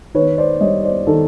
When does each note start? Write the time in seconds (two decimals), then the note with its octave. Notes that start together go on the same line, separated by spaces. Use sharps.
0.15 D#3 B4 C#5
0.38 C5 D5
0.61 G3 C#5 D#5
0.83 C5 D5
1.07 D#3 A4